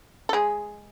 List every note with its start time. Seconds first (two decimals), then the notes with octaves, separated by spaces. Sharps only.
0.29 A4
0.33 G#3 G#4